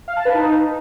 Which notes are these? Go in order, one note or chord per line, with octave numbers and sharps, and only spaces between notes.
F5
A5
B4
D#4